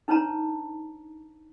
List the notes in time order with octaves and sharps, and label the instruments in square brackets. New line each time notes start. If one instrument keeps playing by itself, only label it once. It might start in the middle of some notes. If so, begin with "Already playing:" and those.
[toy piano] D4 D#4 B4 C#5 A5 A#5